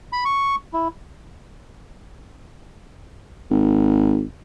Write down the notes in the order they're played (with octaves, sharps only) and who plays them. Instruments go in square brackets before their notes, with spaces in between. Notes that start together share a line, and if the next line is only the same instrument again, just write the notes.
[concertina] B5
C#6
E4
[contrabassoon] G#1